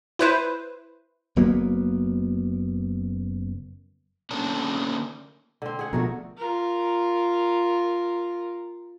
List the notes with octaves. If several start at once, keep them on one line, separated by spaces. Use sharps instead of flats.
E4 B4 C5
F#1 F#3 A#3 B3
D3 A#3 C#4 D4
D3 C4
G#4 F#5
B2 F3 A3 F#4 A#4
F4 A#4